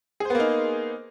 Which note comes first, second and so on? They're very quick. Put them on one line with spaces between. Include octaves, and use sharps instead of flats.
G#4 C5 B3 A#3 D#4